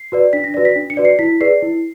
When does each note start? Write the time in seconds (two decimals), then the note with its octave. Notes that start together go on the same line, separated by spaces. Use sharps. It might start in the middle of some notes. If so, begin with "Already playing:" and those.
Already playing: C7
0.12 F#4 B4 D5
0.33 D4 B6
0.44 A#6
0.54 F#4 B4 D5 A#6
0.65 B6
0.76 D4
0.90 C#7
0.97 F#4 B4 D5
1.05 C7
1.19 E4 B6
1.40 G#4 B4 D5 C7
1.62 E4